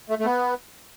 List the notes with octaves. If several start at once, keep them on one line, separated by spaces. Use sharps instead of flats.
A3
A3
B3